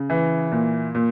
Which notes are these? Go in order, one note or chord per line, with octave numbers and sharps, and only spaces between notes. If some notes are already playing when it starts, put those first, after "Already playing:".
Already playing: C#3
E3
A#2
A#2